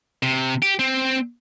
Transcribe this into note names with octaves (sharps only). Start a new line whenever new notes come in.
C3
G4
C4